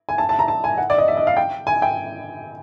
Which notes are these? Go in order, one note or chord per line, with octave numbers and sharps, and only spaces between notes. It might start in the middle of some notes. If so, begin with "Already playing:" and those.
G#5
A5
A5
A#5
A5
G#5
F#5
D5
D#5
E5
D#5
F5
G5
G#5
G5